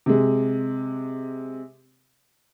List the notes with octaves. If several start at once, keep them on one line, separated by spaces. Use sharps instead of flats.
C3 G#3